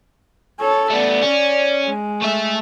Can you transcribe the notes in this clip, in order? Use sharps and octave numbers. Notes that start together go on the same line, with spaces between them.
A4 C#5
A3 B3 D5
C#4
G#3
A3 E5